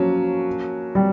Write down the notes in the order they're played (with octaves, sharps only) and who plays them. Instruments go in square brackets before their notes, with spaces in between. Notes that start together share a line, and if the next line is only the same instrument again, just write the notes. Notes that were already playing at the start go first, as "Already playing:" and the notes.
Already playing: [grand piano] F3 A#3 C#4 [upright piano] F#3
[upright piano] G3